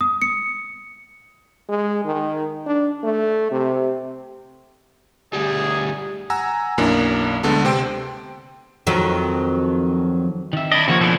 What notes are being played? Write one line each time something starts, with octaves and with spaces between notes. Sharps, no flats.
D#6
C#7
G#3
D#3
D4
A3
C3
D2 G3 G#4
F#5 G#5 A#5 E6
B1 F#2 A#3 D4 E4
D2 D3 G#3 B3 A4 A5
C3 C4 G5 C6 D7
F2 D#3 F#3
D#3 E5
D4 E4 D#5
D#2 C#3 F3 A#3 F#4 C#5
B2 E3 A3 D4 A4